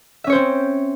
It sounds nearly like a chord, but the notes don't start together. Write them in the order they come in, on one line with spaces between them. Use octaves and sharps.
E5 C#4 C#5 C5 C4